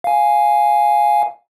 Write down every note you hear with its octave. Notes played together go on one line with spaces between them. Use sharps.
F5 G#5